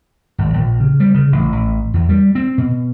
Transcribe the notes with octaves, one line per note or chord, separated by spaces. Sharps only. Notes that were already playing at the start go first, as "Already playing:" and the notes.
G#1
A#1
C#3
G3
C#3
A1
A1
E2
G3
C4
B2